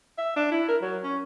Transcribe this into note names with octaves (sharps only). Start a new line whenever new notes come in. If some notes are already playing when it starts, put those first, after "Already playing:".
E5
D4
E4
A#4
F#3
C#4